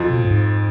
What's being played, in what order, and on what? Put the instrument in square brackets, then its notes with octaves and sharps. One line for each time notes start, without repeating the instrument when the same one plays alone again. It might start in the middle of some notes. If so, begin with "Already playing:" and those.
Already playing: [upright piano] F2 F3
[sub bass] B2
A2
G#2